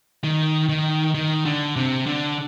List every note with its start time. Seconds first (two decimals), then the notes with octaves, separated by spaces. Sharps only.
0.24 D#3
0.69 D#3
1.15 D#3
1.45 D3
1.76 C3
2.06 D3